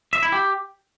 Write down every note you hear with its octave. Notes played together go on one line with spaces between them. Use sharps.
E5
E4
G4